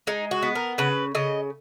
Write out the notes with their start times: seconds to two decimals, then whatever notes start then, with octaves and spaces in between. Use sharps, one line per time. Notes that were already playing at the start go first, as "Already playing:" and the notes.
0.07 G#3 D#4
0.31 F#4
0.43 B3
0.55 A#4
0.78 C#3 B4
1.15 C#3 D#5